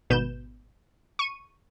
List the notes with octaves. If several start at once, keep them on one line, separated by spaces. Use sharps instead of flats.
G#1 B2 B4 G6 E7
C#6 D#7